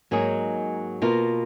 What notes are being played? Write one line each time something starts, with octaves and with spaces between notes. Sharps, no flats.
G#2 F#3 A#3 D#4 G#4
B2 A#3 F4